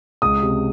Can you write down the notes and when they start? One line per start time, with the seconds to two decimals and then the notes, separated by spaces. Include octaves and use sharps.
0.22 C#2 D#6
0.43 C3